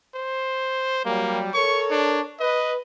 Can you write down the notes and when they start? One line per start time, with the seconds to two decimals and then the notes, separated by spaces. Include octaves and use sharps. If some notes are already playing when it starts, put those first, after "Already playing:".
0.15 C5
1.05 F#3 G3 A#3
1.54 A4 A#4 C#5 C#6
1.90 D4
2.40 B4 D#5